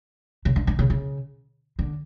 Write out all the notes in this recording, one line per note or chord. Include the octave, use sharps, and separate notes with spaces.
C#3
D3
D3
C#3
C#3
D3